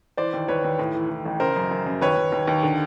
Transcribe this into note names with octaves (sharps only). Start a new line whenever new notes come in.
E3 C5 D5
D#2
D#2 B4 C#5
D#2
A2
E3
A2
A1
C#3 A#4 C5
F#2
F#2
F#2
D#2 B4 C#5
D#2
D#2
D#2
D3